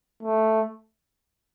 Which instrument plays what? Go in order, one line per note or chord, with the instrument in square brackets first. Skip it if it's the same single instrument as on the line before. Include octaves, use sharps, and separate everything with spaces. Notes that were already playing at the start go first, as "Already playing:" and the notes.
[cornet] A3